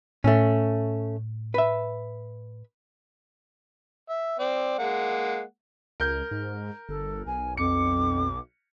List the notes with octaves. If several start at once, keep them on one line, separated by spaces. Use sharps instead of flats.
A2 A3 C#4
B4 E5
E5
C4 D5
G#3 A#3 F#5
C#2 A#4 G6
G#2
G1 A4
B1 G#5
F2 D6 C#7